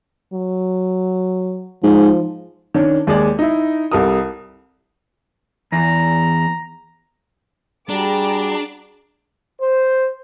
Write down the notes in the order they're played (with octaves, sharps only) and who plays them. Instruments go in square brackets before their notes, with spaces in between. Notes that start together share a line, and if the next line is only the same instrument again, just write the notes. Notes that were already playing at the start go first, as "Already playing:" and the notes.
[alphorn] F#3
[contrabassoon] G#2 [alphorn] F3
[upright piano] D#3 C#4 D4
D#2 G#3 G#4 D5
D#4 E4
C2 G3 A4 A#4 D#6
[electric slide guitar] E2 [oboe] A#5
[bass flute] G3 [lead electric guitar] D4 [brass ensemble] F#4 G#4 [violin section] A5 A#5 D6
[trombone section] C5